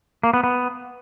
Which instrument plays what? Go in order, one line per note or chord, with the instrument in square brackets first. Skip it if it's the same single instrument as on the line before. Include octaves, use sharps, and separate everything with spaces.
[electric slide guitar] A#3
B3
B3